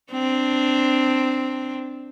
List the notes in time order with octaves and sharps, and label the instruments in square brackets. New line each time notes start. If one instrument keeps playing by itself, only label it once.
[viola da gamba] C4 D4